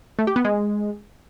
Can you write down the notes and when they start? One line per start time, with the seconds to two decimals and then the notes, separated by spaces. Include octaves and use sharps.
0.19 A3
0.27 G4
0.36 B3
0.45 G#3